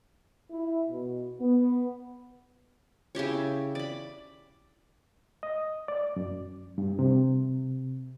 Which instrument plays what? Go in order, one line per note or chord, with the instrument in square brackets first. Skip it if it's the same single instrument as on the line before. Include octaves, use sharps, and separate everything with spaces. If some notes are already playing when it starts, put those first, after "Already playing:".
[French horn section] E4
B2
B3
[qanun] C#3 E4 G4 C#5
D5 B5
[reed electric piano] D#5
D5
F#2
G2
C3